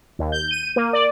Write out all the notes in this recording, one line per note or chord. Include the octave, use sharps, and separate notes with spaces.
D#2
G6
D#7
A#3
D5